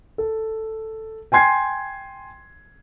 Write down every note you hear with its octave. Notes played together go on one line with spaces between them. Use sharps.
A4
G5 G#5 C6 G#6 C7